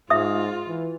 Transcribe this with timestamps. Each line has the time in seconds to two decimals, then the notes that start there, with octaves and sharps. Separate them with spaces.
0.10 G#2 F4 E5 D#6
0.68 E3